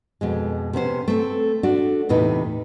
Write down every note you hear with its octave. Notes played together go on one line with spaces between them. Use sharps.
F2 B2 G#3
C3 B3 C#4 C5
A3 C4
A3 D4 F#4
E2 A2 C3 D#4 B4